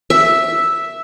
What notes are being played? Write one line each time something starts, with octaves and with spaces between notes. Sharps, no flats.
E5